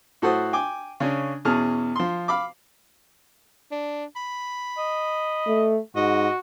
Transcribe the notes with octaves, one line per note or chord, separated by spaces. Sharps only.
A2 F#4 A4 C5 F#5 D#6
G5 G#5 D6
C#3 C#4 D4
E2 B2 C#4 G#4 A5 F6
F3 C6
F5 B5 D6
D4
B5
D#5
A3
G#2 F#4 D#5